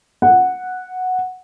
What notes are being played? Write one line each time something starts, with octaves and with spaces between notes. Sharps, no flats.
F#5